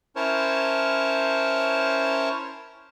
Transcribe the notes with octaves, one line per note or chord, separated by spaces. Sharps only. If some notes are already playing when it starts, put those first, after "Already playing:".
C#4 E4 A#4 C5 C#5 A5